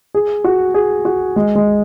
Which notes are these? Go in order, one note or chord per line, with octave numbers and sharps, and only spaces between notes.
G#4
F#4
G#4
F#4
G#3
G#3